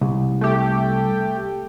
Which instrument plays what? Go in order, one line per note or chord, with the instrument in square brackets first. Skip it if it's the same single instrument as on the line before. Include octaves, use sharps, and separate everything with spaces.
[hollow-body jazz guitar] C2
[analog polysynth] A3 G4